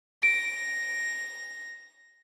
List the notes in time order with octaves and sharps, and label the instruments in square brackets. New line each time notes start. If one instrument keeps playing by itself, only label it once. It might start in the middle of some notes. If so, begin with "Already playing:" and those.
[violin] A#6 [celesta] D7